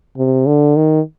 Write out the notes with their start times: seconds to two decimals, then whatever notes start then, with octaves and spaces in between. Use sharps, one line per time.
0.17 C3
0.46 D3
0.76 D#3